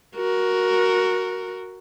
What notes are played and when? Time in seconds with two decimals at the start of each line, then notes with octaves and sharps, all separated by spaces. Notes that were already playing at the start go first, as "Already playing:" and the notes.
0.16 F#4 A#4